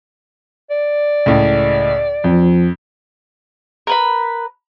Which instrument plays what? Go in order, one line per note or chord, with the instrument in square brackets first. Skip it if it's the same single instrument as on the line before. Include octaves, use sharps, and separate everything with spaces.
[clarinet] D5
[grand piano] C#2 A2
[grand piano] F2 [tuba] F3
[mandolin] A#4 B4 B5